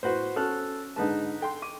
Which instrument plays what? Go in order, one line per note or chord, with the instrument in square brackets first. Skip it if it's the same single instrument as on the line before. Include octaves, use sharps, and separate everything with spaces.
[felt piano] A2 [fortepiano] F#4 B4 C5
[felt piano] C#4 F#4 [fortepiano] A4 F6 F#6
[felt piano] G#2 D3 G#3 [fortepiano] D#4 B4 A5
[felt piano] A4 G5 C6
[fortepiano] D6 [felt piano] D#7